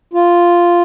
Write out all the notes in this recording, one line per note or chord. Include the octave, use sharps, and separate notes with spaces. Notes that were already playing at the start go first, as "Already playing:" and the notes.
F4